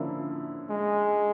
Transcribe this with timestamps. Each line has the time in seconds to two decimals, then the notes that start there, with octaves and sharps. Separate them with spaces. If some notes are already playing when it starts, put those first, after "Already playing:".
Already playing: D3 F3 A#3 C#4 E4
0.71 G#3